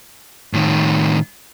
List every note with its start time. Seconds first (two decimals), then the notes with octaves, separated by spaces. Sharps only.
0.53 A2 D#3